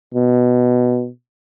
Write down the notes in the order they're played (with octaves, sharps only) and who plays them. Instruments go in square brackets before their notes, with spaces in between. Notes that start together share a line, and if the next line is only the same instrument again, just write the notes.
[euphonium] B2